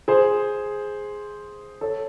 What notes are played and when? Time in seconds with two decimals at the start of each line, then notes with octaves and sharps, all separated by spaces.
0.08 G#4 C5
1.81 A4 C#5